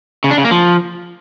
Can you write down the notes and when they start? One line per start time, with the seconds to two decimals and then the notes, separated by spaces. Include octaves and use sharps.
0.24 C#3
0.31 D4
0.38 C#3
0.45 A#3
0.51 F3